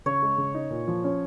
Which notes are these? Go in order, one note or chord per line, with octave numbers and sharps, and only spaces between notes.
C#3 C#5
G#3
C#3
D#4
A#2
F3
C#4